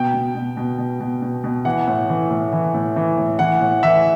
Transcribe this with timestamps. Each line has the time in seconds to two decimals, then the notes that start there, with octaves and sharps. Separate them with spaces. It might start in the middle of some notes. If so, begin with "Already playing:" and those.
Already playing: B2 G5
0.14 B2
0.35 B2
0.57 B2
0.78 B2
1.00 B2
1.22 B2
1.44 B2
1.65 E3 F#5
1.87 A2
2.09 E3
2.31 A2
2.53 E3
2.74 A2
2.96 E3
3.18 A2
3.39 E3 F#5
3.61 A2
3.83 E3 E5